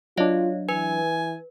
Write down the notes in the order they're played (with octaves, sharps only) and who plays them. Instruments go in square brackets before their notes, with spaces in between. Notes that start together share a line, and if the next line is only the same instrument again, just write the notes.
[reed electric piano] F#3 D4 [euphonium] F4 [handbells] C#5 D#5 F5
[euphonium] E3 [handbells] B4 [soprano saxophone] G#5